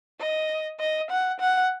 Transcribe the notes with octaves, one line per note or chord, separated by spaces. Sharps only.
D#5
D#5
F#5
F#5